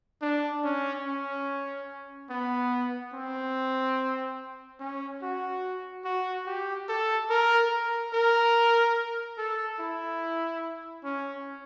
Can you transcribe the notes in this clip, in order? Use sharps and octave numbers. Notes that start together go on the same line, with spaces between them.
D4
C#4
C#4
B3
C4
C#4
F#4
F#4
G4
A4
A#4
A#4
A#4
A4
E4
C#4